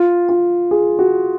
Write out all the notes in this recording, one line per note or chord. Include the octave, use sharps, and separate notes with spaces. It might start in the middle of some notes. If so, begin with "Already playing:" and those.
Already playing: F4
F4
G#4
F#4